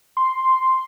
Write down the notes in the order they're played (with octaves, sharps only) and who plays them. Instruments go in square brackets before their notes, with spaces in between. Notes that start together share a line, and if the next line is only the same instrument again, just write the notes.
[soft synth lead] C6